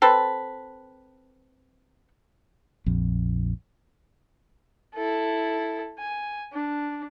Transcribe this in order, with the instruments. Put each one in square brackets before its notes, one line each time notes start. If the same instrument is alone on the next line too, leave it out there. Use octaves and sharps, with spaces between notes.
[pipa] C4 A4 B4
[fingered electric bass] A#1 F2
[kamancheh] E4 A4
G#5
D4